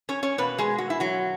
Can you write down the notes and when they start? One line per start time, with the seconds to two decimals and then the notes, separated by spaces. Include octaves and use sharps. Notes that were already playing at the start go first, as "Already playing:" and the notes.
0.09 C#4 C#5
0.23 C#4 C#5
0.38 B2 A#3 B3 B4
0.58 G#3 G#4
0.78 F#4
0.90 E4
1.00 F#3 F#4